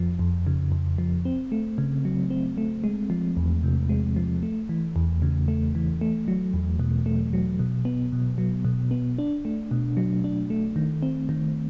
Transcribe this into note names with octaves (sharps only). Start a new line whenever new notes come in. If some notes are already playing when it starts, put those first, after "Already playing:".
Already playing: F2 F3
F2
C#3
F2
F3
C4
A3
C#3
F#3
C4
A3
G#3
F3
E2
C3
G#3
F3
A3
E3
E2
C#3
A3
E3
A3
F#3
E2
B2
A3
F#3
B2
B3
B2
F#3
B2
B3
D4
A3
B2
F#3
D4
A3
D#3
C4
D#3